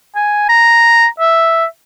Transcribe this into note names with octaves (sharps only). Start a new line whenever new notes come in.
G#5
A#5
E5